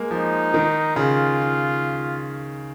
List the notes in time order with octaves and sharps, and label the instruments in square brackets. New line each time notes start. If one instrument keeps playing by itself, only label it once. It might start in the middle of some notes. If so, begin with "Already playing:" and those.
Already playing: [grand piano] G#3 A#3
[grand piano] F3 [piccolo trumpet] D#4
[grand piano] D#3
[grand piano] C#3 [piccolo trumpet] F4